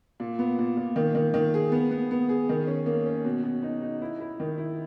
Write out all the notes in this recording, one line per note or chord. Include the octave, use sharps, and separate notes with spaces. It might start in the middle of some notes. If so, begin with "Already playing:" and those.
A#2
B3
A#2
A#2
D#3
D#3
D#3
G#4
B3
B3
B3
G#4
D#3
C#4
A#3
C#4
B2
B2
D#4
D#4
E4
E4
D#3
E4